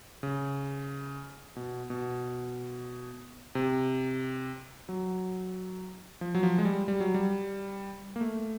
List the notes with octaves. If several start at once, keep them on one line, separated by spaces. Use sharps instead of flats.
C#3
B2
B2
C3
F#3
F3
F#3
F3
G#3
G3
G3
F#3
G3
A#3
A3